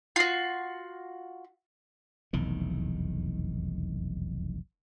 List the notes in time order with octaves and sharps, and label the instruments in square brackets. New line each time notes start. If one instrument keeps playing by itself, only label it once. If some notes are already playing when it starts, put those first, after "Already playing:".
[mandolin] F4 F#4 [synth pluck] C7
[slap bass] F1 B1 E2 D#3